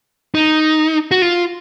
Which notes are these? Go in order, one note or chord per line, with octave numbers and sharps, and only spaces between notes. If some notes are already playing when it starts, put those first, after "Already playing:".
D#4
F#4
F4